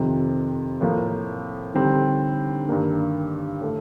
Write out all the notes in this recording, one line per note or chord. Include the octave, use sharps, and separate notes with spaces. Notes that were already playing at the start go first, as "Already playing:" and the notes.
Already playing: F2 C3 D#3
A2 F3 A#3
D3 G3 C4 D#4
G2 D#3 A#3 D4
A2 A3